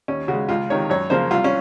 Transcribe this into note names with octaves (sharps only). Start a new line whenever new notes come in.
D#2 C#4
C#3 F#4
G#3
C#2 F4
C3 D#3 C#5
F#2 C#5
C#3 F3 A#3 C5
C2 F4
C#4